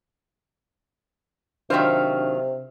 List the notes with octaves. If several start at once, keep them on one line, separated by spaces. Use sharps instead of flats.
C3 D#3 F#3 D4 F4 C5 E5 G5